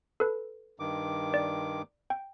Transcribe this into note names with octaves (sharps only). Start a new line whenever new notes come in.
A4 B4
G2 D#3 D6
D5
G5